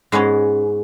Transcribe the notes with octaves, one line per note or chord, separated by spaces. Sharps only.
G#2 G#3 B3 C#4